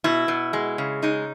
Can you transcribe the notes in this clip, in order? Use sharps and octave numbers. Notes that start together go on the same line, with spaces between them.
B2 E4
B2
G#3
C#3
G#3 D#4